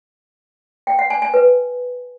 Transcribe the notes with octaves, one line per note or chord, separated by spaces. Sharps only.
G5
F#5
G#5
G#5
B4